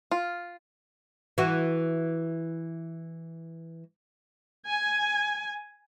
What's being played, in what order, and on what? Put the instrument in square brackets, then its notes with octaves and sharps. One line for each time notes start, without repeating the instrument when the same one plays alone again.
[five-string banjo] F4
[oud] E3 F#4
[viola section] G#5